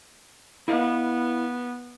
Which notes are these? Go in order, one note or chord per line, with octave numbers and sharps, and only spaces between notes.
B3 E4 D#5 F5